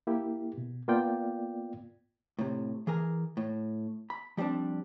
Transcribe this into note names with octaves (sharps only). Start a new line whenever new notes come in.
A#3 E4 G4
B2
A#3 B3 F4 D5 G5
A2 C3
E3 G#4 A#4 G#5
A2
B5
F3 G3 A3 C4 D4